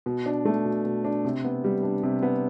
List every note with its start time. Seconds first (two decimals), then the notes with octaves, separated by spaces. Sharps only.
0.06 B2
0.26 D4
0.45 A3
0.65 B2
0.85 B2
1.05 D4
1.25 C3
1.44 B3
1.64 G3
1.83 D4
2.03 C3
2.23 B3